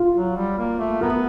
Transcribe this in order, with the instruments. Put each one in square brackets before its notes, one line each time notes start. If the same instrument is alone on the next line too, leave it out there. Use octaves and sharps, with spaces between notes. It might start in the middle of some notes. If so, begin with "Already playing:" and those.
Already playing: [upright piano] F4
[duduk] F#3
G3
A#3
A3
[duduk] B3 [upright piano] A#4